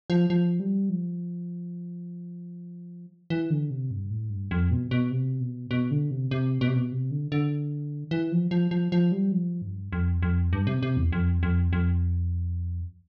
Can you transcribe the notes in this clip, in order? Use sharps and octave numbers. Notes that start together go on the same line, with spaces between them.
F3
F3
G3
F3
E3
D3
C3
G2
A2
G2
F2
B2
B2
C3
B2
B2
D3
C3
C3
B2
C3
B2
C3
D3
D3
E3
F3
F3
F3
F3
G3
F3
G2
F2
F2
G2
C3
C3
E2
F2
F2
F2